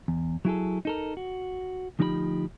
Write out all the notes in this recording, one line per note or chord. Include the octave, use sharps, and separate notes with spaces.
E2
F#3 E4 G#4 A4
D#4 A4 A#4
F#4
D2 F3 D#4 G4 D5 B5